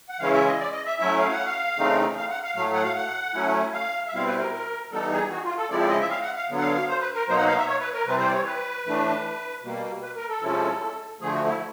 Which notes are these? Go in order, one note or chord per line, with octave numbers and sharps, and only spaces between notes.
F#5
C#3 E3 G#3 C#4 E4 F5
E5
D#5
D5
D#5
E5
F#3 A3 C#4 E4 E5
F5
F#5
F5
C#3 E3 A3 C4 D#4
F5
F#5
F5
A2 F#3 A3 F5
F#5
F5
F#5
F#3 A3 C#4 E4
F5
E5
B2 G3 C4 E4 F5
B4
A#4
A#4
E3 G3 B3 D#4 A4
G#4
F#4
F4
A4
C#3 F3 G#3 C4 E4 D5
D5
D#5
E5
F5
F#5
F5
D3 F#3 B3
F#5
F5
F5
C5
B4
A#4
B2 F#3 A#3 D#4 C5
F#5
F5
E5
C#5
B4
A#4
C3 E3 G3 C4 B4
C5
D5
C#5
B4
A2 E3 A3 D4
B2 G3 A#3
B4
A#4
A4
C3 F3 G#3 C#4 E4
D3 F3 A3 G#4
F#4
E4